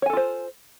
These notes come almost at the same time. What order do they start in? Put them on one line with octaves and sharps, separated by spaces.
C#5 G#5 A4 F4 C5